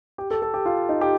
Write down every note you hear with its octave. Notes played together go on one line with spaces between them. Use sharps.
G4
A4
A4
G4
F4
D#4
G4